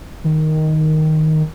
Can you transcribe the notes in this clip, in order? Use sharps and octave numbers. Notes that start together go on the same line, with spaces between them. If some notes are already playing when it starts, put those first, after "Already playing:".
D#3